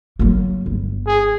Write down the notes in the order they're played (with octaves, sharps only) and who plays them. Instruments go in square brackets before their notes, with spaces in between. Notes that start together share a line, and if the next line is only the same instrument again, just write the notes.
[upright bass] F#3 A#3
G1
[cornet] G#4